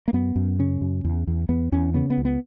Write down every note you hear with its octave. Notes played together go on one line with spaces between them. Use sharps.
A#3
F#2 B3
F#2
C#3 C#4
F#2
E2
E2
E2 B3
E2 C#4
C#3 B3
B3
C#2
B3